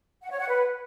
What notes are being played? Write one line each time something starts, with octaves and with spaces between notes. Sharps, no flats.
F#5
C#5
F#5
B4